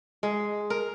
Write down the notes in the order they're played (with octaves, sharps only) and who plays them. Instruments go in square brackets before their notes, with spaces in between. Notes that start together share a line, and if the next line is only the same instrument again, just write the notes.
[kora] G#3
A#4